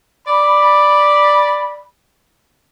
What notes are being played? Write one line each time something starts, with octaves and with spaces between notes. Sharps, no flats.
D5 B5